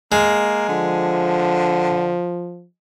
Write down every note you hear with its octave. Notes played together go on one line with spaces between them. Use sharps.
G#3 A#3
D3 F3